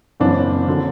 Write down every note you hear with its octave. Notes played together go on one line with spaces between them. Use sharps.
F#1 F#2 C#3 E3 C4 D4
D3 F#3